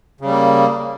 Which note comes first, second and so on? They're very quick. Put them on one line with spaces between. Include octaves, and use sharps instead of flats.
C#3 G3 A#3